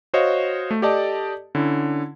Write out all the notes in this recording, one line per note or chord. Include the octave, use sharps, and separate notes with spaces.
F#4 C5 C#5 D#5 F5
A3
G4 A4 D5 D#5 A5
D3 C#4 E4